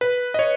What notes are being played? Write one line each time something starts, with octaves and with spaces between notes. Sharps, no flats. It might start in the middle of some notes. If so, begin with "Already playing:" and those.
B4
D#5
C#5